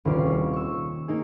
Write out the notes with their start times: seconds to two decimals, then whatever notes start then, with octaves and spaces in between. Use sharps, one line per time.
0.05 D#1 C2 C#4 F4 D6 C7
0.25 C4 C#5
0.53 C#6 E6
1.08 A#3 D#4 G#4